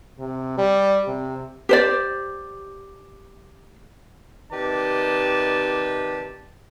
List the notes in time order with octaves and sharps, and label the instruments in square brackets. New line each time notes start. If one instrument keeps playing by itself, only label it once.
[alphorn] C3
G3
C3
[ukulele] G4 C5 D5
[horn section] C3 D#3 G4 B4 D5 A5